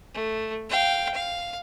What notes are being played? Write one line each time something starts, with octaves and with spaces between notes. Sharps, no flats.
A3
F5 G5
F5